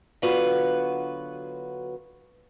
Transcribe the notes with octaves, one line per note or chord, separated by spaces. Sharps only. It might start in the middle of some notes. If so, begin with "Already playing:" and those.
D3 F#3 B3 F4 F#4 B4